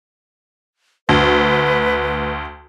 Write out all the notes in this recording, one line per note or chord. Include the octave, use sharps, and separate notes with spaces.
D2 B4